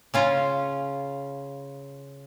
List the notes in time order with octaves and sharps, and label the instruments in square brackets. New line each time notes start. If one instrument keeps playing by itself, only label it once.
[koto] C#3 C#4 F4